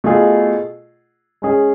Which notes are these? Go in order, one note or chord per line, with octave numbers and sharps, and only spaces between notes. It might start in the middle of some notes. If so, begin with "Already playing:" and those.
B2 A3 F4 G#4
G#3 C#4 G#4